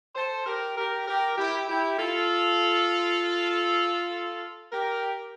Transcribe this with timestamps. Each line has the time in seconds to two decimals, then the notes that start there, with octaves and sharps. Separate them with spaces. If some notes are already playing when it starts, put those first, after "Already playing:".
0.16 A4 C5
0.46 G4 A#4
0.77 G4 A#4
1.08 G4 A#4
1.37 E4 G4
1.69 E4 G4
1.98 F4 A4
4.72 G4 A#4